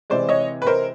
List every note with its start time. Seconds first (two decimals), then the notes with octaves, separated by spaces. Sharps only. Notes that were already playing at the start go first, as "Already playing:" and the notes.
0.10 C3 E3 G#3 C5 D5
0.29 C#5 D#5
0.62 B4
0.67 A#4 C5